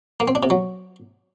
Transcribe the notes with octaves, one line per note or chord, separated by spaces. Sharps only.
A#3
C4
D4
C3
F#3